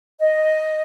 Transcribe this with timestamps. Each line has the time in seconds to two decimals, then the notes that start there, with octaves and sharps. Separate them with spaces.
0.19 D#5